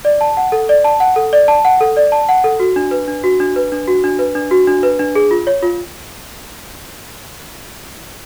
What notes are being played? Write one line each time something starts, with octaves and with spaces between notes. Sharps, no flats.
D5
A5
F#5
A4
D5
A5
F#5
A4
D5
A5
F#5
A4
D5
A5
F#5
A4
F#4
D4
B4
D4
F#4
D4
B4
D4
F#4
D4
B4
D4
F#4
D4
B4
D4
G#4
F4
C#5
F4